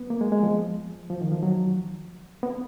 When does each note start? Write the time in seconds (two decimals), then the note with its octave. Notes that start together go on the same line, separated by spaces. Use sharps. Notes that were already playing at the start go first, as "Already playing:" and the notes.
Already playing: B3
0.10 A#3
0.21 G#3
0.32 G#3
0.43 F3
1.10 F3
1.21 D#3
1.32 F3
1.43 F#3
2.43 B3